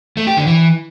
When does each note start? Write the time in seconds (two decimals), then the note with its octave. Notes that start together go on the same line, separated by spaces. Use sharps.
0.17 A3
0.27 G4
0.37 D3
0.47 E3